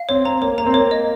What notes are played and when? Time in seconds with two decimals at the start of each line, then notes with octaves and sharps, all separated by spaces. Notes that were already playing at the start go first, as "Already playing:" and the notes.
Already playing: F5
0.09 C4 C#5
0.25 C4 A#5
0.42 A#3 C#5
0.58 A#3 A#5
0.66 C4
0.74 A#3 C#5
0.91 D#5